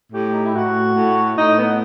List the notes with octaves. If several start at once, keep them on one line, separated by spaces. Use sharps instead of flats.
A2 G4
D#4
E4
A2 F#4
A2
A2 D#4
B3